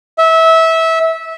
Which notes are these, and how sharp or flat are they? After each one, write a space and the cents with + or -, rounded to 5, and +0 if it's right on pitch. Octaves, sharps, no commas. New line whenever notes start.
E5 -20